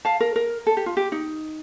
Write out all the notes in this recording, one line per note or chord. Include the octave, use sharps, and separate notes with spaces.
F5 A5
A#4
A#4
A4
G4
F4
G4
D#4